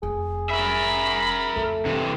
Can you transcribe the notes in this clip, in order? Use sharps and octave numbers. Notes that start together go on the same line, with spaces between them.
F1 G#4
A#4 E5 B5
F2 C#3 A3
C3 E3 G3